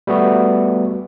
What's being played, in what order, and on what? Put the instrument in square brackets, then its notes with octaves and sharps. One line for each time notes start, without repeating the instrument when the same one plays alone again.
[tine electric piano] G3 A3 B3 F#4